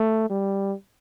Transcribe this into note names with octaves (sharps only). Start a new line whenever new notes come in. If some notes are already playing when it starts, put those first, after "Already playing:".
Already playing: A3
G3